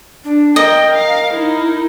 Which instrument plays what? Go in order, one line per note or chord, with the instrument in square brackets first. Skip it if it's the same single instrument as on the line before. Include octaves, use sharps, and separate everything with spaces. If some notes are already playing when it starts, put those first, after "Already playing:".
[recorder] D4
[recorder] A#4 [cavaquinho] D#5 [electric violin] G5
[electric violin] F5
D#4 E4